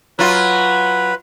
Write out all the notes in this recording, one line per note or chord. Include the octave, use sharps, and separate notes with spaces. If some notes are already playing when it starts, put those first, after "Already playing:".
F#3 F4 B4